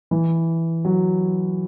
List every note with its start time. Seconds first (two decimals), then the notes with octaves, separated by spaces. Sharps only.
0.11 E3
0.85 F#3